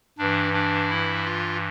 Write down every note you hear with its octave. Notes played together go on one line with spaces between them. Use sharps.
G2 E3 D4
D4
E4
F4